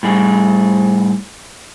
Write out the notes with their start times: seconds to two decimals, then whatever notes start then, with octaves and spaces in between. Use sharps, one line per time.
0.03 A2 G3 G#4